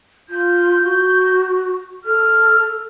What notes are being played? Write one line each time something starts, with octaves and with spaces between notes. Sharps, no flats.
F4 G6
F#4
A4 F6